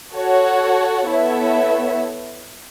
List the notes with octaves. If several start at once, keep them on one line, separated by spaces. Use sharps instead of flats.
F#4 A4 C#5
B3 E4 A4 C#5 E5